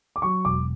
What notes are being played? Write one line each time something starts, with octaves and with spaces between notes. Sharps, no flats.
D6
F#3 C#6
E1 D6